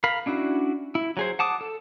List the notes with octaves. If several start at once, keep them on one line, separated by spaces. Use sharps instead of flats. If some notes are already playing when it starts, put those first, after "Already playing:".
A#4 F5 B5
C#4 D4 E4 F#4
E4
F#3 G#4 C5
F#5 A5 D6 D#6
A4